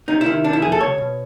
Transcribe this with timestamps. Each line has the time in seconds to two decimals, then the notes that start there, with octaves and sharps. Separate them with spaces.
0.08 C3 D#4
0.21 E4
0.26 D#3
0.44 C3 D4
0.53 E4
0.62 F2 G#4
0.72 A4
0.81 C#2 C#5
0.98 B2